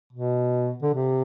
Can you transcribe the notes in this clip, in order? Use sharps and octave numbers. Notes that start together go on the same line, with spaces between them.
B2
D3
C3